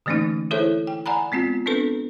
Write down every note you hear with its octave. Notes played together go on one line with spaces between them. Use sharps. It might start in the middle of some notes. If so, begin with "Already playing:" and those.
D3 E3 A3 A#3 C#4 D#4
E4 G#4 A4 C5 C#5 E5
G5
D5 F#5 G#5 A#5 B5
G#3 B3 C4 F4
B3 C4 D4 A4 B4